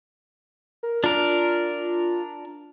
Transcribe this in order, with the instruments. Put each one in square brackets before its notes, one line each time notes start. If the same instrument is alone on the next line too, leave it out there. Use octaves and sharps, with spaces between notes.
[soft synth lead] A#4
[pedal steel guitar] D4 A#4 [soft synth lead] F4